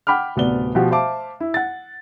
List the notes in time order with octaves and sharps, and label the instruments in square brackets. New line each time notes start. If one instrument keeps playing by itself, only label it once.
[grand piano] F#5 G5 B5 D6 F6
D1 C3 B3 D5 G7
B2 F3 G4 F#5
C5 E5 F5 A5 D6
E4
F#5 A6